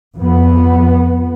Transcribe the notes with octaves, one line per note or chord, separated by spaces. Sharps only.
F2 B3